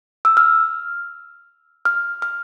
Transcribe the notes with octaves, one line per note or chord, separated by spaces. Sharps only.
E6
F6
F6
F6